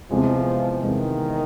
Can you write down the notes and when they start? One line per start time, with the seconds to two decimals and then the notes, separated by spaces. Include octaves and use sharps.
0.11 E2 C3 E3 F3 G#3
0.82 E2 C3 D#3 E3 G#3